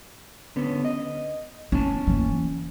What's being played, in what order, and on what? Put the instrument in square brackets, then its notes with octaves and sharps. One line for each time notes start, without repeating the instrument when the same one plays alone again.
[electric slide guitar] D3 B3 C#4
D#5
[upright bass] B3 [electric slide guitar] C#4 G#5 A5
[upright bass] E3 A#3